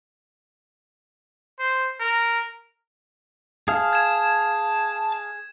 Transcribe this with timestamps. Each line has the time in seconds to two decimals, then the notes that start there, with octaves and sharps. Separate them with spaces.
1.59 C5
2.00 A#4
3.68 G#4 F5 A5
3.93 G#6 E7